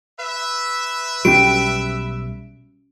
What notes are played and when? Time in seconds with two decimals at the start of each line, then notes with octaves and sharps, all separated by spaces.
0.18 B4 E5
1.25 B1 G3 C#4 F#4 D7